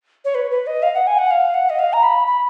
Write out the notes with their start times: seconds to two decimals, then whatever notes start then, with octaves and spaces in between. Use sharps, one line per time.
0.25 C#5
0.35 B4
0.51 B4
0.66 D#5
0.83 F5
0.94 F#5
1.07 G#5
1.18 F#5
1.31 F5
1.54 F#5
1.70 D#5
1.79 F5
1.93 A#5
2.03 B5
2.27 B5